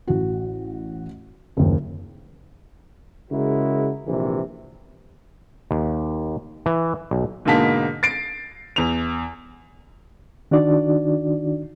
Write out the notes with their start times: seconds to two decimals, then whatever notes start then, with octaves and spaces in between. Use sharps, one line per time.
0.08 A1 F#4
1.57 F#1 D#2
3.31 C#3 G#3 E4 F#4 A#4
4.05 A#1 C3 E3
5.71 D#2
6.66 E3
7.11 B1
7.45 G#2 B2 D3 A#3 A5 B6
8.03 A6 C7 D7
8.76 E2 F7
10.51 D#3 D4 D#4 F#4 D5